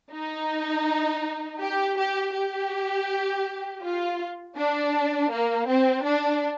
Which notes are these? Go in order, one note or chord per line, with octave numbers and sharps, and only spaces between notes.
D#4
G4
G4
G4
F4
D4
A#3
C4
D4